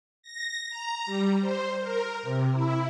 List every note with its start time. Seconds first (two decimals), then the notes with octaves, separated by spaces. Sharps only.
0.23 A#6
0.69 A#5
1.06 G3
1.41 C5
1.80 A#4
2.23 C3
2.52 E4